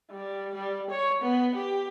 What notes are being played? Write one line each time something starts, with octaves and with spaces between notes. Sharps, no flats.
G3
G3
C#5
B3
G4